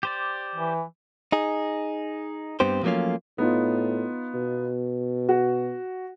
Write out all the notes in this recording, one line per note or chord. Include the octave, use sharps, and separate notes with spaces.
G4 C5 D5
E3
D#4 G#4
G2 B3 C4 G4 C5
F3 F#3 A3 A#3 C#4 F4
A2 B3 D#4 F4
B2
F#4